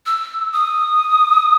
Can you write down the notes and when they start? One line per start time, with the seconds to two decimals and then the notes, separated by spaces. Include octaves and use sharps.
0.06 E6
0.53 D#6